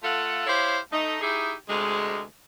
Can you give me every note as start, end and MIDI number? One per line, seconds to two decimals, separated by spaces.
0.03 0.44 57
0.03 0.44 65
0.03 0.44 69
0.03 0.44 77
0.03 0.44 78
0.47 0.78 64
0.47 0.78 67
0.47 0.78 72
0.47 0.78 73
0.47 0.78 77
0.92 1.18 57
0.92 1.18 63
1.22 1.53 63
1.22 1.53 64
1.22 1.53 67
1.22 1.53 68
1.69 2.22 38
1.69 2.22 48
1.69 2.22 56